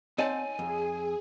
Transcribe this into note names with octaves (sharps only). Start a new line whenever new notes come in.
C4 D#4 C#5 D#5 F#5 G#5 A5
F2 G#4